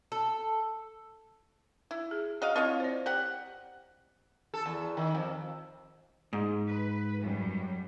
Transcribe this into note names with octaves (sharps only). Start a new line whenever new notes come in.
A4
E4
G#4
F#4 D#5 F5
C4 E4 F4 C#5 D#5
C5 D5
G4 F#5
A4
E2
D#3
F2
G#2
B4
F#2 G3